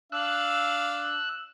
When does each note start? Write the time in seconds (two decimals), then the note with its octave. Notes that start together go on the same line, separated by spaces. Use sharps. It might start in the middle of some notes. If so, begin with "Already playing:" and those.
0.12 D4 F5 E6 F#6